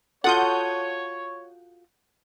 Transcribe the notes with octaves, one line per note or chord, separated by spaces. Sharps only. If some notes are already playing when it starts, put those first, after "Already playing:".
F4 F#4 A4 C#5 F#5 D#6 G6